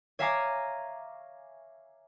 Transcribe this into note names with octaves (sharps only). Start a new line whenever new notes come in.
C#5 E5 F5 G#5 A#5 D6